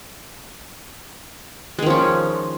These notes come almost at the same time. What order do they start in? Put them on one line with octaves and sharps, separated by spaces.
G#3 D#3 F3 C#4